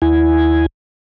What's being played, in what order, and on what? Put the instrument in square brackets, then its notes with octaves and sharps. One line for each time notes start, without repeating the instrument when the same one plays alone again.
[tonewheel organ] D#2 E4 G#5